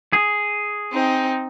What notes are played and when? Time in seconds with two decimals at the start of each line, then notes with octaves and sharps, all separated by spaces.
0.13 G#4
0.92 C4 D#4